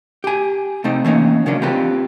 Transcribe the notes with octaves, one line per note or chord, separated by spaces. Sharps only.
G4 G#5
C3 A3 C4 D#4
E3 A#3 C#4 D#4
C#3 F#3 A#3 C#4 D4
C4 F4 G4 B4